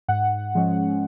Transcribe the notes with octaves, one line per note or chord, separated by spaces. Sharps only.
G#2 F#5
F3 G#3 C#4